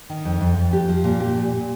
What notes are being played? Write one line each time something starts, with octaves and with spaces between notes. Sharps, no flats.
D#3
F2
F2
F2
G4
F3
A#2
G4
A#2
A#2